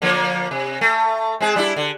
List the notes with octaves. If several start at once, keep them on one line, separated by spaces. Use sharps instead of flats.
D3 F3 A#3
C3
A3
G#3 C4 G#4
G3 D4 E4
D3